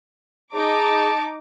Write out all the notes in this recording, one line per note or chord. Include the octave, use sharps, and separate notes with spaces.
D#4 G#4 A5 D6